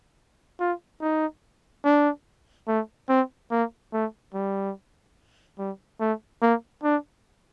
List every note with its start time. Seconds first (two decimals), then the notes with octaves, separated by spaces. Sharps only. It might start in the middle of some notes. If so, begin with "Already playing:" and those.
0.60 F4
1.01 D#4
1.84 D4
2.68 A3
3.09 C4
3.51 A#3
3.93 A3
4.34 G3
5.58 G3
6.00 A3
6.42 A#3
6.84 D4